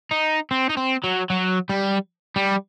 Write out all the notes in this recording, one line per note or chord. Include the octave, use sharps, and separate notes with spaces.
D#4
C4
D#4
C4
F#3
F#3
G3
G3